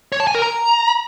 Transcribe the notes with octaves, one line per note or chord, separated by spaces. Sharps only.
C#5
A5
G#5
A#4
A#5